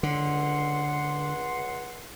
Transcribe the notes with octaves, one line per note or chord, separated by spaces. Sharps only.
C#2 D3 F#5 C6